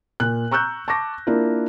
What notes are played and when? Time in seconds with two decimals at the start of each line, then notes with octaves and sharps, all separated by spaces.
0.20 A#2 F#6
0.51 A#5 C#6 E6 F#6 G6
0.88 A5 C#6 D6 A#6
1.27 A#3 D4 E4 F4 A#4